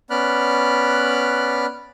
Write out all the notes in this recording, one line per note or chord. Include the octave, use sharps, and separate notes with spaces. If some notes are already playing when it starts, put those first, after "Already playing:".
B3 C#4 D5 B5 F6 F#6